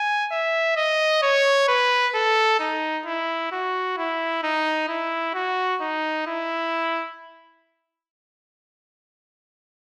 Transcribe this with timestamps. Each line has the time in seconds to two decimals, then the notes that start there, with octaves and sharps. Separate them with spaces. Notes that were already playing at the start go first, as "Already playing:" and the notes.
Already playing: G#5
0.31 E5
0.76 D#5
1.23 C#5
1.68 B4
2.15 A4
2.59 D#4
3.06 E4
3.52 F#4
3.98 E4
4.43 D#4
4.88 E4
5.34 F#4
5.81 D#4
6.27 E4